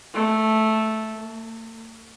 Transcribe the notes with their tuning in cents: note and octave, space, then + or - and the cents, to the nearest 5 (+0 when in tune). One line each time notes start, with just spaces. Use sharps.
A3 -5
A3 +45